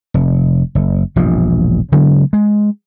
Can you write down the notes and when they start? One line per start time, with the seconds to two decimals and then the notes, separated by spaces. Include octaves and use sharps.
0.14 F1
0.75 F#1
1.16 E1 A#1 G2 F3
1.92 C#3 F#3 G#3 B3
2.33 G#3